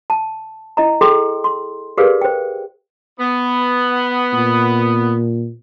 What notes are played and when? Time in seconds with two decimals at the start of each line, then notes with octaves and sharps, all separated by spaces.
0.10 A5
0.77 E4 D#5 A#5
1.01 G#4 A4 G5 C6
1.44 C6
1.97 G4 G#4 A#4 B4 D5 F5
2.21 C5 G5
3.20 B3
4.33 A#2